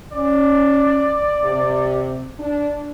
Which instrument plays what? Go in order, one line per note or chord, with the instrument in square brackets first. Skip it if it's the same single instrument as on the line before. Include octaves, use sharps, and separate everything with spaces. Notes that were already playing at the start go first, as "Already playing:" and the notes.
[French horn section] C#4 [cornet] D5
[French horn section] C3
D4